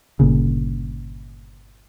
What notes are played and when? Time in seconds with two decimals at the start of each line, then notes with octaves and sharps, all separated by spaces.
0.20 G1 A#2 C#3